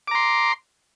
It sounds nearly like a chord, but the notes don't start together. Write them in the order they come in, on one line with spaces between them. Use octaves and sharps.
D6 A#5 C6